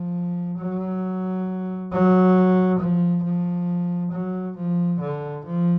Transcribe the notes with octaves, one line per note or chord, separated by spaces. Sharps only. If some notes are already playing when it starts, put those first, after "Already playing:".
Already playing: F3
F#3
F#3
F3
F3
F#3
F3
D3
F3